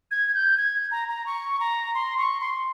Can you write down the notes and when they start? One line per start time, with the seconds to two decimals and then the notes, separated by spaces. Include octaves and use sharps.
0.11 G#6
0.35 G6
0.58 G#6
0.91 A#5
1.09 A#5
1.26 C#6
1.60 A#5
1.95 C6
2.18 C#6
2.40 C6